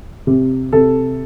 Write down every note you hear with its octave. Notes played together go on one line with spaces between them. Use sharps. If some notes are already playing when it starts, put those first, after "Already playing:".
C3
C3 A4